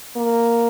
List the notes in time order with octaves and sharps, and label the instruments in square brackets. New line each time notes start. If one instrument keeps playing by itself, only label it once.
[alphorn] A#3